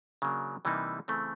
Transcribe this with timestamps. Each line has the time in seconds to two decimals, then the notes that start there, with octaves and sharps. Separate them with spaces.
0.22 C#3 F#3 A#3 D4
0.65 C3 E3 G3 A#3 D#4
1.08 C#3 E3 A3 C4